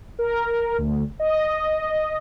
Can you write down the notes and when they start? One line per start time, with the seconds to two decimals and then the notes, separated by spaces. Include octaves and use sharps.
0.19 A#4
0.78 D2
1.20 D#5